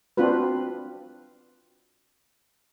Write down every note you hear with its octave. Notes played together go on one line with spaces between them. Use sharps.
C4 D4 F4 F#4 B4